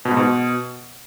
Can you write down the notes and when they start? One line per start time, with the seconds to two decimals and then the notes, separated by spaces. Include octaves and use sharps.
0.05 B2
0.11 G#2
0.17 B2